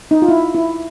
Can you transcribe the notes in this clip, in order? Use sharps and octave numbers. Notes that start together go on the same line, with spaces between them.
D#4
F4
E4
E4